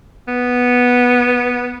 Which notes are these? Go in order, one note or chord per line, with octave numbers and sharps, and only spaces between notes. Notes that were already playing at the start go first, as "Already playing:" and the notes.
B3